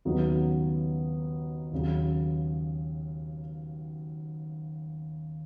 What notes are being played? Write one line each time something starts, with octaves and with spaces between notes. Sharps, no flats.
D#2 C#3 F#3 B3 D#4
D#2 C#3 F#3